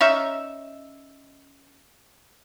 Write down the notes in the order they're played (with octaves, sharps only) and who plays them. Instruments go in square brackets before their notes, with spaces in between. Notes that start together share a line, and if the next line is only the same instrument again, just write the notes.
[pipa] C#4 D#4 E5